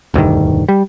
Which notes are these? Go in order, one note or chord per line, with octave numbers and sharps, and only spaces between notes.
E1 D2 G2 D#3
G3